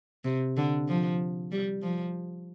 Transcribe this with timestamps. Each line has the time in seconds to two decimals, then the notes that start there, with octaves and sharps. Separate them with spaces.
0.24 C3
0.57 D3
0.88 F3
1.51 G3
1.82 F3